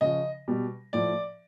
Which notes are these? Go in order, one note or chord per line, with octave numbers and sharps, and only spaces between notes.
C#3 F3 D#5
B2 G3
A2 F3 D5